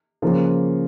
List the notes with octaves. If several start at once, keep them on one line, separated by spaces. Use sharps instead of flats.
C#3 F3 A#3